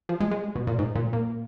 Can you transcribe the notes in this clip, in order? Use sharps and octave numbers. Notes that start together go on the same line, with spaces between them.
F3
G#3
G#3
B2
A#2
G#2
A#2
A#2